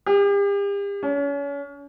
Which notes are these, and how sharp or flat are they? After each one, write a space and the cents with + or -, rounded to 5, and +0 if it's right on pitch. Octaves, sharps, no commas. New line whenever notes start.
G4 +40
C#4 +35